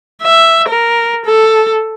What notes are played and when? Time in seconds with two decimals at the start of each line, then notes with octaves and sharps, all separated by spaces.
0.22 E5
0.69 A#4
1.25 A4